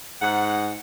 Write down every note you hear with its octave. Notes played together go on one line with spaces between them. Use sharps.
G#2 F#5